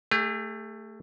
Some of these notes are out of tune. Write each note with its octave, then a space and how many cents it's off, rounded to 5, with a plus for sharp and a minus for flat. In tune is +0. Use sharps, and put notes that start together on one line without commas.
A3 +15 G#4 -40